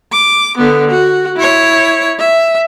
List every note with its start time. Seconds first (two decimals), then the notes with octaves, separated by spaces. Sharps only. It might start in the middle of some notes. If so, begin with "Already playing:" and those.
0.12 D6
0.58 D3 B3
0.91 F#4
1.37 E4 C#5
2.19 E5